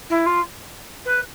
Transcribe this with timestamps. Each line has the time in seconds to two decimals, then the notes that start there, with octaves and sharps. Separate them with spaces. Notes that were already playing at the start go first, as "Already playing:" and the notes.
0.10 E4
0.26 F4
1.05 B4